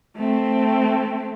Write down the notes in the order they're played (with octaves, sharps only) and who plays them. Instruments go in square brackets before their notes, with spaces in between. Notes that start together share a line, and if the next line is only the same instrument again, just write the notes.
[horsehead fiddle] A3 C4